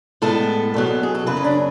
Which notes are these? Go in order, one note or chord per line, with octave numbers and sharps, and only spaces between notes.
A2 G#3 B3 A4
E2 B2 F#3
G#4
A4
F#2 C#3 F#3 B4
C#4
D4